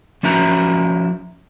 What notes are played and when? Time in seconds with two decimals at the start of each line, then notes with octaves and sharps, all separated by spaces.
0.23 F3 C#4 E4 F#4 A#5